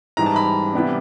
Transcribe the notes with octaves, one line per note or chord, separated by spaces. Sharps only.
G#2 E3 G3 A#5
A5
B5
C3 E3 G3 B3 D4